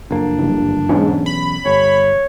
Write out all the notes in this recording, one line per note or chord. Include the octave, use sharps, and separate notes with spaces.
F#1 F2 A#3 D4
G1
B1 E2 G#2 C#4
B5
G1 C#5